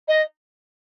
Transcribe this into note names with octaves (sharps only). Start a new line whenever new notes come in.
D#5